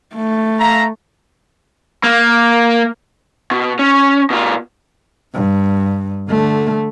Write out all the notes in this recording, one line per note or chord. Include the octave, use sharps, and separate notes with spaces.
A3
E5 F5 A#5
A#3
B2
C#4
B2 F4
G2
D3 A3